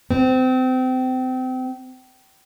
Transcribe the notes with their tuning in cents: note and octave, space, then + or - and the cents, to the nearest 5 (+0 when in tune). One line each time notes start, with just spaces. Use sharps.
C4 -30